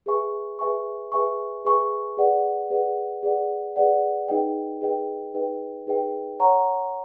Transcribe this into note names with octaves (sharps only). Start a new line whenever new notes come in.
G#4 B4 E5 G#5 C#6
G#4 B4 E5 G#5 C#6
G#4 B4 E5 G#5 C#6
G#4 B4 E5 G#5 C#6
G#4 B4 D5 F#5
G#4 B4 D5 F#5
G#4 B4 D5 F#5
G#4 B4 D5 F#5
D#4 G#4 B4 D#5 G5
D#4 G#4 B4 D#5 G5
D#4 G#4 B4 D#5 G5
D#4 G#4 B4 D#5 G5
C#5 F#5 A#5 C#6